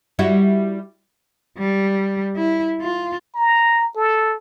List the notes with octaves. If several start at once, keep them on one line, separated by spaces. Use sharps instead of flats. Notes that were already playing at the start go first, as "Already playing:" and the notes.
G3 E4 F#4
G3
E4
F4
A#5
A4